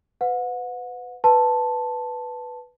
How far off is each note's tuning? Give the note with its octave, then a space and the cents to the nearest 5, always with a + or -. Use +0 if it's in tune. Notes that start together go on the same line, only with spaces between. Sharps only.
B4 +30 F#5 -35
B4 +0 A5 +0 C6 +0